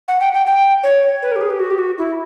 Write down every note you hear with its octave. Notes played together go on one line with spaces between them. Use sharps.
F#5
G5
G5
G5
C#5
B4
A#4
G4
G#4
G4
F#4
G4
F#4
E4